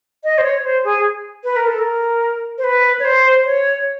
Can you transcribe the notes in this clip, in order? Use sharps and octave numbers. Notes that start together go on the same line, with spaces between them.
D#5
C5
C#5
C5
G#4
B4
A#4
A4
A#4
C5
B4
C#5
C5
C#5